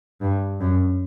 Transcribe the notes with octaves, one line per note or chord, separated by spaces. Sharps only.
G2
F#2